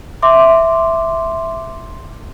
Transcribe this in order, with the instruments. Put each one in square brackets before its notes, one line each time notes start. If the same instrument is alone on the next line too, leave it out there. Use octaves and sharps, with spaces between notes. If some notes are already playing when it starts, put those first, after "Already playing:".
[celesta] E5 C6 D6